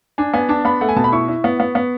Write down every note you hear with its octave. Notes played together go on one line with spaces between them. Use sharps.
D4 G#5
B3 G#5
D4 A5
B3 B5
A3 F#5
G#5
B2 A5
B5
E4 C#6
E4
B3
B3
B3